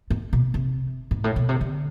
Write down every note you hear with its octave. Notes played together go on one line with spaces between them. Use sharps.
G#2
B2
C3
G#2
A2
B2
C3
D3